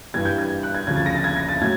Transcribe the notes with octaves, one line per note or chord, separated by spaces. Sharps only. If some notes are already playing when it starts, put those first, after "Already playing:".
G2 E3 G3 G#6
G6
G#6
F#6
G#6
D2 C#3 F3 G#6
A6
A#6
A6
G#6
A#6
A6
A2 F#3 G#6